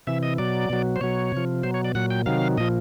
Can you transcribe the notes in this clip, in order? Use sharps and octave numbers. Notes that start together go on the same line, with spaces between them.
C3 E3 E5
D#5
B2 F#3 D5
B2 F#3
C5
B2 F#3 C#5
C3 F3
B2 F#3 C5
C#5
D5
A#2 F#3 F#5
G5
C3 D#3 F#3 F5
A#2 F3 D#5